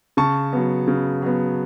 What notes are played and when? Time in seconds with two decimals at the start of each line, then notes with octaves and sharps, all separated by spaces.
0.17 C#3 A5 C#6
0.53 F#3 B3
0.88 C#3
1.22 F#3 B3